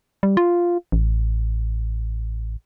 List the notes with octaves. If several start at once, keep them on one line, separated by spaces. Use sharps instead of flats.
G3
F4
A1